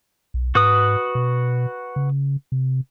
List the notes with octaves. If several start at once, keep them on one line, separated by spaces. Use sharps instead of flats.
B1
G#2 F#4 B4 D#6
B2
C#3
C3